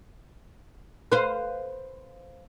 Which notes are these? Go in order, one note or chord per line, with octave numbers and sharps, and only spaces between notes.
B4 C5 F5